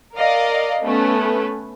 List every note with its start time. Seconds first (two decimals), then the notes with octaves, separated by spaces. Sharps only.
0.16 A#4 D5 D#5 F5
0.81 A3 B3 C#4 B4